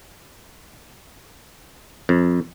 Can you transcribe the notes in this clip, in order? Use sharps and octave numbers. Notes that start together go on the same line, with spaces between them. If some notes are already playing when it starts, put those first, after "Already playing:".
F2